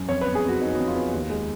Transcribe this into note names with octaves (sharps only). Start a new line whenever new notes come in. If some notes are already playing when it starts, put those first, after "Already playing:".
Already playing: F#2
F2 C#5
B4
B3
G#4
F2
F#4
B3 D#4
F2 F#4
F4
B3
D#2
G#3